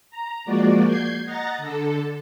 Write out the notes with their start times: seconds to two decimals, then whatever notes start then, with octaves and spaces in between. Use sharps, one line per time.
0.10 A#5
0.45 F3 G#3 A#3 F#4 D5
0.85 G6 G#6 C7
1.25 D#5 F#5 A#5 A6 A#6
1.58 D3 A4